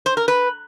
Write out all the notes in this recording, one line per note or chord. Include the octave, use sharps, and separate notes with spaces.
C5
A#4
B4